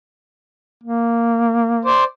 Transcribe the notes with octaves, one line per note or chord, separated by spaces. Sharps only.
A#3
C5 D5